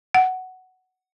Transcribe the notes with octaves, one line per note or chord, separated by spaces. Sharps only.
F#5